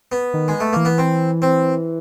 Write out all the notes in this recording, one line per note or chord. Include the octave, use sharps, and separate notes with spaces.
B3
D#3
G#3
A3
E3 A#3
B3
C4
C4